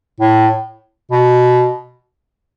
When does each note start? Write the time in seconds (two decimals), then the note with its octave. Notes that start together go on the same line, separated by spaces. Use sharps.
0.20 A2
1.11 B2